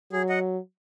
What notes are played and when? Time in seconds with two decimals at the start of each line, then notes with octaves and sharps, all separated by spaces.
0.12 F#3 G#4
0.29 D#5 F#5